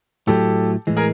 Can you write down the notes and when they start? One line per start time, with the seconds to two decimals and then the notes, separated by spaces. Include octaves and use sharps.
0.27 A2 F#3 A3 G4 A4
0.87 A2 E3 G#3
0.97 G#4 A#4